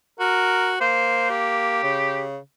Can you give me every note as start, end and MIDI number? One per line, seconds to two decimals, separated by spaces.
0.19 0.77 66
0.19 0.72 70
0.81 1.82 58
0.81 1.25 72
1.30 2.24 67
1.83 2.38 49